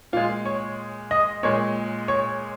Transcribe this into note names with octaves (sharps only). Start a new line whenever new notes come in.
A#2 G#3 F4
C#5
D#5
A#2 G#3 C#5
C#5